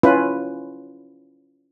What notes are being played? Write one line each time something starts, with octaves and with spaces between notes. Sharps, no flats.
C#4 E4 F4 B4